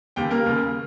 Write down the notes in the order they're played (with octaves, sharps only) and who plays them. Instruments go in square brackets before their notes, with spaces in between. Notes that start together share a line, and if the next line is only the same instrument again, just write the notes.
[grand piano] D#2 C#3 G4 G5
A#3 A#4
D#2 C#3